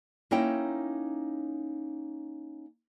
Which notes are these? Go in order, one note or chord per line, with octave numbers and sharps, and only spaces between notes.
A#3 C#4 D#4 E4 C#5 G5